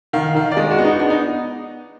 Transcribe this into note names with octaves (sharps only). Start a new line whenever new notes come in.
D#3 F5
D#3 F5
D5
G#3 D#5
F#4
B3
D#4
B3 D4
D#4